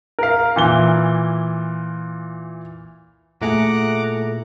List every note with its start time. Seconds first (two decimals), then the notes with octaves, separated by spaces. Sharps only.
0.19 A#4 F5
0.56 A#2 E3 G7
3.42 A#2 A3 E4 G#4 F#5 A#5 D6